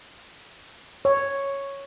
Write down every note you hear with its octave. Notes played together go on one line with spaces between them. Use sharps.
C#5